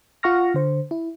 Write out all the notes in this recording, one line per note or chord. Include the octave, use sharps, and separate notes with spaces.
F4 F#5 C#6 F6 A#6
D3 C5
E4